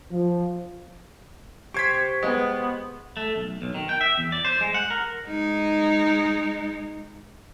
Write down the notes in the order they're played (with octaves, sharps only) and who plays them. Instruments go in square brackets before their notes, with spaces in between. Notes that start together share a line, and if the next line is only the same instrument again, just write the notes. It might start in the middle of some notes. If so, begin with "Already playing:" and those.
[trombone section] F3
[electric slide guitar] G4 C5 [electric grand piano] C#6 G#6 B6
[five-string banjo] G#3 [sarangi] B3
[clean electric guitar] A3
B1
B1
D#3
G5
E5
E2
D5
C5
G#3
F#5
A#4
[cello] G#3 D#4